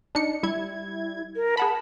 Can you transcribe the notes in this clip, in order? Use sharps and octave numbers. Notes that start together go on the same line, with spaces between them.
D4 D#4 C#7
G3 E4 G#6
A#4
G#4 F#5 A5 B5